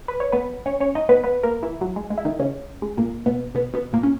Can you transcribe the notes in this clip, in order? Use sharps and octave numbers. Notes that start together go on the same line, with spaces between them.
B4
C#5
B3 B4
C#4 C#5
C#4 C#5
D#4 D#5
B3 B4
B3 B4
A#3 A#4
E3 E4
F#3
G#3
G#3
E4
D#3 D#4
C#3 C#4
G#3
A#2 A#3
B2 B3
B2 B3
B2 B3
A#2 A#3
C#4